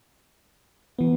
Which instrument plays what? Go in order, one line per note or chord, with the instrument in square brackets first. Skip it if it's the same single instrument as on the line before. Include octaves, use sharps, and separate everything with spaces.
[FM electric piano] E3 B3